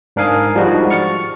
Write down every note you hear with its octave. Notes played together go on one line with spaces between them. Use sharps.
G#2 D4 A#4 F5 G#5 D#6
F3 G3 G#3 D4 D#4 F#4
C#6 F6 A6 C#7